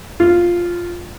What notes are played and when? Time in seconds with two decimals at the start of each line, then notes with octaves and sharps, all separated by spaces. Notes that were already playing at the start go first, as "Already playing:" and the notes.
0.20 F4